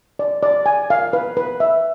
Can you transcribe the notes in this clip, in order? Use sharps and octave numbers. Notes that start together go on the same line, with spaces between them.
D5
D5
G#5
F5
B4
B4
E5